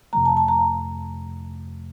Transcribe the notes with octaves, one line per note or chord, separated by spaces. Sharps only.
F2 C3 F3 A3 A#5
A5
A5
A#5